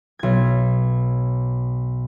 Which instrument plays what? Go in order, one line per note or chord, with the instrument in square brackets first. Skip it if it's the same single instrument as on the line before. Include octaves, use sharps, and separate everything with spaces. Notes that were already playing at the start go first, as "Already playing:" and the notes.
[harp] B1 G#6